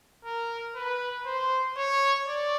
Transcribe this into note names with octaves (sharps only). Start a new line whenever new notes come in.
A#4
B4
C5
C#5
D5